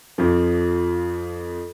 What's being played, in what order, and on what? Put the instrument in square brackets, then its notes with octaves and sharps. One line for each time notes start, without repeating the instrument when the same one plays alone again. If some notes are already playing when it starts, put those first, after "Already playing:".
[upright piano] F2 F3